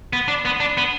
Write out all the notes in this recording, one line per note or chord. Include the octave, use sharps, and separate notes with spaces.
B3
D4
B3
D4
B3